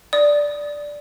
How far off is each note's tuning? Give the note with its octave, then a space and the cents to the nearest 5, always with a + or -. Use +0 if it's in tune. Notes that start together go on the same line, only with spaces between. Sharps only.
D5 +0 D#6 +0